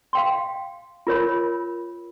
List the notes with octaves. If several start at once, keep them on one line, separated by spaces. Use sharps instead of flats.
F5 G5 C6
F4 A#4 C#5 B5